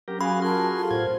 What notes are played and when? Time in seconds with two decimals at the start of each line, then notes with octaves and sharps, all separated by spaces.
0.08 F#3 C#4 G4 A#4
0.21 F#4 G#4 F5 G#5 B5
0.42 F4 F#4 G#4 A#4 A5 C6
0.77 F4 G4 A4
0.91 A2 C5 G#6